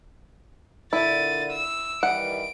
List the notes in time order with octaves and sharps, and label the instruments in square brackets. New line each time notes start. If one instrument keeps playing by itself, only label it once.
[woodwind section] A#2 D3 [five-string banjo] E4 [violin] A6 D#7
[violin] E6
[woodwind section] D#3 E3 G3 [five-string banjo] F#5 [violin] D7